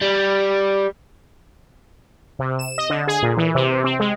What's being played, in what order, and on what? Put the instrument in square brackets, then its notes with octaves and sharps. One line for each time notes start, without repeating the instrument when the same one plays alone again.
[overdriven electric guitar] G3
[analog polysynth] C3
E7
D#5
D3
G#4
A#2
E3
C3
C4
G#3